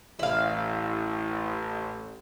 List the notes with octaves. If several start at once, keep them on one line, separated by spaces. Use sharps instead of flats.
A1 E4 F5